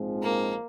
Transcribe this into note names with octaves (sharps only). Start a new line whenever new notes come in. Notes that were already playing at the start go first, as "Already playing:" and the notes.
Already playing: A#1 G#2 F3 G#3 C4
A#3